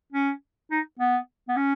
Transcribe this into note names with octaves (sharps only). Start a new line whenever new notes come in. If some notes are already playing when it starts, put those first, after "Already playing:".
C#4
D#4
B3
B3
C#4